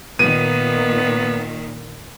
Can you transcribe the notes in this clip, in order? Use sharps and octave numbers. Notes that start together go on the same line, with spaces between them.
A#2 D#3 B3 D#7